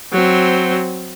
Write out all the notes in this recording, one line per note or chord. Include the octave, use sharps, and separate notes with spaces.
F#3 C4